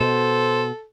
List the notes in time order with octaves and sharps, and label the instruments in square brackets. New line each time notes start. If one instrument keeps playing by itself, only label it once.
[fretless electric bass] B2 [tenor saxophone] A4 [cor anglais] C5